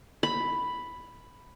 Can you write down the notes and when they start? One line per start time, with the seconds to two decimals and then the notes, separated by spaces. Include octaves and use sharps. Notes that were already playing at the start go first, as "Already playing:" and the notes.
0.23 B5